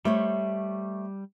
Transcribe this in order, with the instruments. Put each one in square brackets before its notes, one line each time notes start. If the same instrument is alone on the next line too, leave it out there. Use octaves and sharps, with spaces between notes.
[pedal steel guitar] G3 [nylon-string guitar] A3 C5 C#5